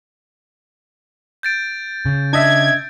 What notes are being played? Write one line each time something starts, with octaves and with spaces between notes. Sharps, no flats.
G6 A6 D7
C#3
D4 D#5 E5 G#6